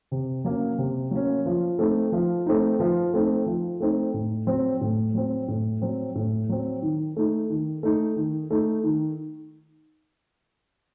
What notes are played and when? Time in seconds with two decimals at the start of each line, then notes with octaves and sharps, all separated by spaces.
0.11 C3
0.45 F#3 A#3 C#4
0.78 C3
1.11 F#3 A#3 C#4
1.46 F3
1.79 A3 C4 D#4
2.12 F3
2.46 A3 C4 D#4
2.80 F3
3.14 A3 C4 D#4
3.46 F3
3.80 A3 C4 D#4
4.14 A2
4.47 F#3 C4
4.81 A2
5.14 F#3 C4
5.48 A2
5.82 F#3 C4
6.15 A2
6.49 F#3 C4
6.82 D#3
7.16 A3 D#4
7.50 D#3
7.83 A3 D#4
8.16 D#3
8.50 A3 D#4
8.84 D#3